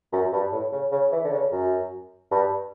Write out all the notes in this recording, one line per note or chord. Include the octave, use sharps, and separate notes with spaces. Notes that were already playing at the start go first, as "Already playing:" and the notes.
F#2
G2
A2
C#3
C#3
E3
D3
C#3
F#2
G2